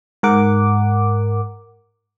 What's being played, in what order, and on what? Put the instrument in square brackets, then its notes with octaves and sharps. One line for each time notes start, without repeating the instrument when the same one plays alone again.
[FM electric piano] G#2 A#4 F#5 D6